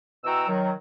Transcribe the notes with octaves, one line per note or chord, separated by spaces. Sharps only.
B2 E3 F#4 G5 A#5 E6
D#3 F#3